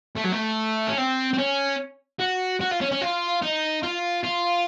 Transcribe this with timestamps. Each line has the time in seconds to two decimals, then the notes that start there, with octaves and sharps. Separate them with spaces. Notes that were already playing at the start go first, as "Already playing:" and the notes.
0.16 A3
0.24 F#3
0.32 A3
0.87 C#4
0.97 C4
1.33 C4
1.38 C#4
2.20 F#4
2.61 F#4
2.71 F4
2.81 C#4
2.91 C#4
3.01 F4
3.42 D#4
3.83 F4
4.24 F4